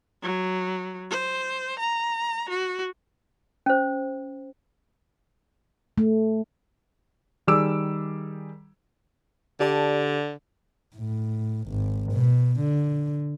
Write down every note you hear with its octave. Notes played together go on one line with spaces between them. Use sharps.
F#3
C5
A#5
F#4
C#4 C5
A3
D#3 G3 G#4 D6 E6 D7
D3 G4 D5 A5
A2
G#1
B2
D3